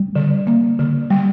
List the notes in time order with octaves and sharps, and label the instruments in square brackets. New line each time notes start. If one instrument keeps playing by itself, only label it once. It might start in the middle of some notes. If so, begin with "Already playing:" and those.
Already playing: [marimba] G3
D3
A#3
D3
G3